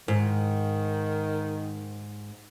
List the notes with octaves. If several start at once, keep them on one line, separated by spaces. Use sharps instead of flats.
G#2 D#3